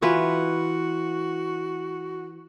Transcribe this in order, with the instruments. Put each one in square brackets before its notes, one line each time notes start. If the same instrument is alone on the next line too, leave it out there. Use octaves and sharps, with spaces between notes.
[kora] E3 F4 B4 [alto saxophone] F#4